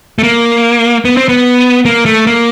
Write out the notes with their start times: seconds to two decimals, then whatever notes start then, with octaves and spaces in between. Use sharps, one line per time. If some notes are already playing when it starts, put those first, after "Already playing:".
0.19 A3
0.23 A#3
1.05 B3
1.17 C4
1.29 B3
1.86 A#3
2.06 A3
2.27 A#3